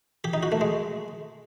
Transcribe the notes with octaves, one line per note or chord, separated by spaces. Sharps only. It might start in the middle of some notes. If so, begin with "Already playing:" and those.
G4
D#4
F#4
A3
G#3